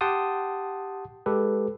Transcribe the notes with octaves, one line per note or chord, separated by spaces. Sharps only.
G4 F#5 G5 A5 C6 D#6
G#3 G4 A4 B4